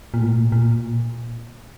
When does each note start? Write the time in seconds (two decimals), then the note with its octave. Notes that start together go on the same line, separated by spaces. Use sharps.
0.14 A#2
0.22 A2
0.30 A#2
0.52 A#2